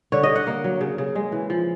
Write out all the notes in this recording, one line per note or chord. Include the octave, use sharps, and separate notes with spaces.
D3 C#5
D#5
D3
F#5
A#3
F#3
C#3
C#3
G#3
E3
F3